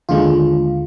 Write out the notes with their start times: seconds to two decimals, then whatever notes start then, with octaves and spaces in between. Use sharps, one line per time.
0.09 D#2 D3 G#3 F4